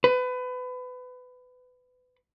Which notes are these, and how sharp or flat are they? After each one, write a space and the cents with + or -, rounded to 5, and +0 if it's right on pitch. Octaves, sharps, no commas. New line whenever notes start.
B4 +25